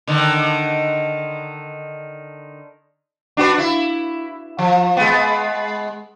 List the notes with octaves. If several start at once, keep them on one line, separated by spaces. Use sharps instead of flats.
D3 D#3 D#4
D4 F#4 B4
E4
F3
G#3 B3